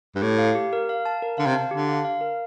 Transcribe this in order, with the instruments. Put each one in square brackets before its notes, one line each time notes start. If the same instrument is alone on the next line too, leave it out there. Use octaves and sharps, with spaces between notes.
[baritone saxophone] G2
[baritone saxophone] A2 [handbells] G4
[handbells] F5
G4
A#4
F5
A5
A#4
[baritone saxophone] D3 [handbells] F5
[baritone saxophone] C3
[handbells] A5
[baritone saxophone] D3 [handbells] G4
[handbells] F5
F5
A#4